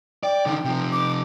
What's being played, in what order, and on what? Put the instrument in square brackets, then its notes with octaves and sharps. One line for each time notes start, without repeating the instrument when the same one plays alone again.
[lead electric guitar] D5 [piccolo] G5
[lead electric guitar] D3 D#3
C3 F3
[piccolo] D6